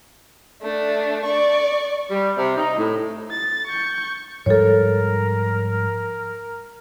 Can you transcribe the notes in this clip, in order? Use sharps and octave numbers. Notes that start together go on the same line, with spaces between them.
A3 D4
D5 C#6
G3
C3
D#4
A2
A6
C#6 G6
G#2 F3 G3 A4 A#4 C#5